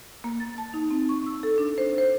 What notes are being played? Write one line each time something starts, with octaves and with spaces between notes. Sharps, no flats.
A#3
A6
A5
D#4
C4
C#6
E6
A4
D4
C5
C5